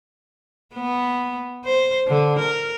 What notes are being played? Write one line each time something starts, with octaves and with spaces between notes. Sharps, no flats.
B3
C5
D3
A#4